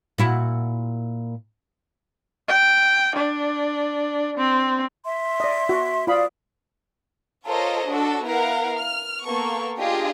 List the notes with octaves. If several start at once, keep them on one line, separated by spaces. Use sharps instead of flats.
A#2 E4 F#4
G5
D4
C4
E5 C6
D5 D#5
F#4
F4 D5 F5 B5 D#6
F4 A4 A#4 C5 C#5 D#5
D4 F#4 A4
B3 E4 A#4 F5 F#5
F6
A#3 B3 A4 C#6
D4 F4 G4 G#4 D#5